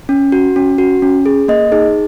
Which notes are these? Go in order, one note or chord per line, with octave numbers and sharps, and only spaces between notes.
C#4
F#4
C#4
F#4
C#4
G#4
A#3 D#5
D#4 G#4